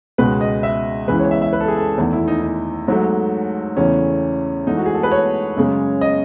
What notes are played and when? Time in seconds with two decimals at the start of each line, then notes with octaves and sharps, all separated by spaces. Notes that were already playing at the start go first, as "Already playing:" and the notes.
0.18 C#2 B2 G#3 B4
0.41 D#5
0.63 E5
1.08 C#2 C#3 E3 G#3 B4
1.20 C#5
1.31 E5
1.42 E5
1.53 B4
1.60 A4
1.68 G#4
1.76 A4
1.98 E2 D#3 A3
2.13 E4
2.28 D#4
2.43 D#4
2.88 G#2 F#3 A3
3.77 E2 C#3 E3 A3 C#4
4.67 G#2 E3 A3 D#4
4.77 F#4
4.86 G#4
4.95 A4
5.03 B4
5.12 C#5
5.56 F#2 C#3 G#3
6.01 D#5